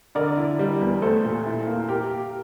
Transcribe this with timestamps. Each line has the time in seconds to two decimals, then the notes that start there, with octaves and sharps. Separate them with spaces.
0.15 D3 A#4 D5
0.37 E4
0.59 G3
0.81 E2
1.02 A3 A4 C5
1.25 A#2
1.46 E4
1.67 A#3
1.89 G4 A#4